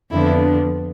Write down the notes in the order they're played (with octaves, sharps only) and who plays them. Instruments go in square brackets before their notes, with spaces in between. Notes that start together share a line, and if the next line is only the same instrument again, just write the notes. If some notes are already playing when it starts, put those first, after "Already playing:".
[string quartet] F2 D3 F3 B3 D4 E4